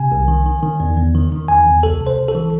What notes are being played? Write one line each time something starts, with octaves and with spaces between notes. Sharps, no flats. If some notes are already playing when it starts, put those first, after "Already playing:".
Already playing: C3 G#5
C2
D#3
D#3
D#3
E2
E2
D#3
D#3
E2 G#5
E2
C#2 A4
C3
C5
C#2
A4
E3